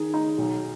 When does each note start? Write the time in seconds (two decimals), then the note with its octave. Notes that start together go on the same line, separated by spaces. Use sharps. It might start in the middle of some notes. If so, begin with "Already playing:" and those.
Already playing: D#3 G#4
0.14 D#4
0.38 B1